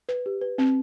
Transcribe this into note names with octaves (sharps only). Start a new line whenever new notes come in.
B4
G4
B4
C4